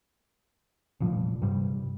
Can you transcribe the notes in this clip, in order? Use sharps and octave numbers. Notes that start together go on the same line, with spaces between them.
F1 A#2 F3 G3
G2 C3 G3